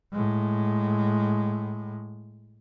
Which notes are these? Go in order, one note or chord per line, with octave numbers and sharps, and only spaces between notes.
A2 G#3